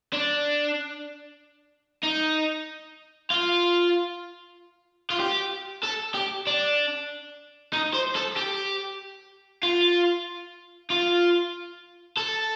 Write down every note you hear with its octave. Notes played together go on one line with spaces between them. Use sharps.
D4
D#4
F4
F4
G4
A4
G4
D4
D#4
C5
A4
G4
F4
F4
A4